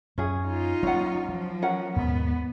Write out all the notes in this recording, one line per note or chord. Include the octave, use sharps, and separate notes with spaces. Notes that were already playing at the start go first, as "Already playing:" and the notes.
F#2 C#4 G#4
D#4 F4
F#3 G#3 A#3 C#4 F#5
F3 F#3
C#4 A#4 F#5
D#2 G#2 B2 B3